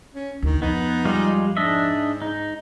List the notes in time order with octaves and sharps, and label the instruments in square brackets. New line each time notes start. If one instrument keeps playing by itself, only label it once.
[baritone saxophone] C#4
[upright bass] D2 [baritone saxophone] D#3
[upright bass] F2 [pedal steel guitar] B3 [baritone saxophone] D#4
[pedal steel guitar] G3 G#3 F4
[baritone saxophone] G#2 [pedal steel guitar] D4 D#5 E5
[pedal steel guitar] D#4